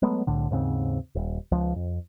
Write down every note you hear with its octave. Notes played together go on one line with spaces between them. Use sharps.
F#3 G#3 A3 B3
C2 A2 D3
D#2 G#2 C#3 C4
D#1
C#2 F3
F2